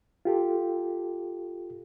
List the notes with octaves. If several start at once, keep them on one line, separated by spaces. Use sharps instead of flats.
F4 G4 A4